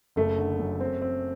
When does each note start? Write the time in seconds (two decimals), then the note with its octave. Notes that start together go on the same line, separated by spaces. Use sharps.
0.16 F#1 A3
0.38 D3
0.59 F#2
0.80 C4
1.02 C4